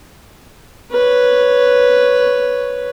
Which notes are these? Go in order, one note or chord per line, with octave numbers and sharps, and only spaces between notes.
B4 C#5